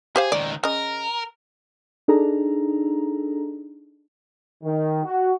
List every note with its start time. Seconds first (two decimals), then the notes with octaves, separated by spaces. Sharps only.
0.16 G4 G#4 C5 F5
0.32 C#2 D#3 D5
0.64 C#3 A#4 D#5
2.08 D4 D#4 G#4 A4 A#5
4.63 D#3
5.04 F#4